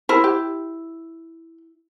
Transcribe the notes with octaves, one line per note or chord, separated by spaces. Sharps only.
E4 A#4 C5
G4